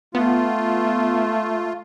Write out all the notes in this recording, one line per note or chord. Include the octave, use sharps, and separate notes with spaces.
A3 B3 F4